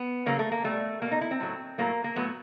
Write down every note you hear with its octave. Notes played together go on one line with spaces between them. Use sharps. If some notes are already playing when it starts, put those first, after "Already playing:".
Already playing: B3
C#3 F#3 A3 A#3
A3
A#3
B2 G3 A3
B2 G3 A#3
D#4
E4
C4
A2 F#3 A3
A2 F#3 A3 A#3
A#3
A2 F#3 A3 B3